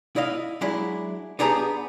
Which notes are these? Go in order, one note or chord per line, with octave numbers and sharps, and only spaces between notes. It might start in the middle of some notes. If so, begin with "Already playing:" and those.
E4 D5 D#5 F5
F#3 G#3 D4 E4
B3 D4 G4 G#4 A#5